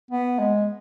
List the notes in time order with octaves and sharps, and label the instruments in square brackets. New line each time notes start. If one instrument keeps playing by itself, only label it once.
[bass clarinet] B3
G#3